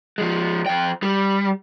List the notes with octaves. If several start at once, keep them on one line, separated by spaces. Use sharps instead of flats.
F3 G#3
F2 G5
G3